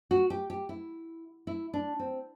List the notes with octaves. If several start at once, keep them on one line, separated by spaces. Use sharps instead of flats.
F#4
G4
G4
E4
E4
D4
C4